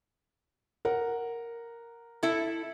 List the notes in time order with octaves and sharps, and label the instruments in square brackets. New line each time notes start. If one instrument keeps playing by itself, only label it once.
[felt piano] A#4 F#5
[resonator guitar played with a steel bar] E4 A4